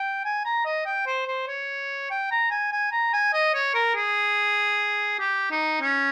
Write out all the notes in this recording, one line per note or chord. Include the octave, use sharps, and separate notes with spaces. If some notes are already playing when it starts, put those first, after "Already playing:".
Already playing: G5
G#5
A#5
D#5
G5
C5
C5
C#5
G5
A#5
G#5
G#5
A#5
G#5
D#5
C#5
A#4
G#4
G4
D#4
C#4